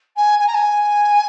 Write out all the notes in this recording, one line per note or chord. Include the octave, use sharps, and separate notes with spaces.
G#5
G#5
A#5
G#5